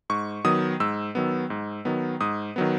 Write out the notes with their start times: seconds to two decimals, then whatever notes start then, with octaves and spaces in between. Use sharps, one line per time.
0.10 G#2 C#6
0.44 D#3 F#3 B3 D#6
0.80 G#2 E6
1.15 D#3 F#3 B3
1.50 G#2
1.85 D#3 F#3 B3
2.21 G#2 D#6
2.56 D#3 F#3 B3